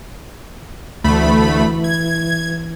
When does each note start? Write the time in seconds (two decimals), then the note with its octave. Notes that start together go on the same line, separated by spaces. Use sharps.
1.04 D2 E3 A3 B5
1.84 G#6